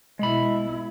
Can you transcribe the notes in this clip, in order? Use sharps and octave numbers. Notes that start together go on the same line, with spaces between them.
B2 G#3 E4 B5